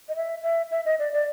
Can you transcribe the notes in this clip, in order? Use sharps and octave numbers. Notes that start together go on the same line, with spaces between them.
D#5
E5
E5
E5
D#5
D5
D5